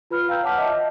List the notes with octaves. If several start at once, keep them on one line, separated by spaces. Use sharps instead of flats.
F4 B4 B5 F6
F5 G5 A#5 E6 G6
C#5 F#5 A5 D6 F6 B6
D#5 E5 A5
D#5